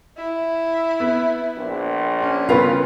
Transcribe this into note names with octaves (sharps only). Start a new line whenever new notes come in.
E4
B3
A#1
C#4
G2 C#3 B3 F4 A#4 B4